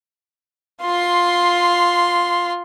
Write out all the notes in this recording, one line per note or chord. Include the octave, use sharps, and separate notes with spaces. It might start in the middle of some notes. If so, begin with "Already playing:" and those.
F4 C6